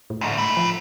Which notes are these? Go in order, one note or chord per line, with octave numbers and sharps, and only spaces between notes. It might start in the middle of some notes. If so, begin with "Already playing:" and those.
A2
D2 G#2
A4 B5
F3